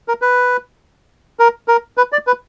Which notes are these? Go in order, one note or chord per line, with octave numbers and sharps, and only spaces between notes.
A#4
B4
A#4
A#4
B4
D5
B4